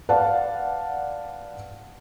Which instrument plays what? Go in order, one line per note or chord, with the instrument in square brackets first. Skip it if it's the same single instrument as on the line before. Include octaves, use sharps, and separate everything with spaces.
[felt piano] B4 D5 F5 F#5 A5